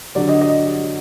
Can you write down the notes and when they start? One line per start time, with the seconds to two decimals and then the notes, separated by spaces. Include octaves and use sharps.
0.15 D3 F#3 D5
0.29 D#5
0.41 D#5